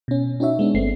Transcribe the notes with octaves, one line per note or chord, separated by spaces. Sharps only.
B2 C#4
C#4 D#4 F#4 C#5 E5
G#3 B3 C#4 D4
G1 A3 C4 C7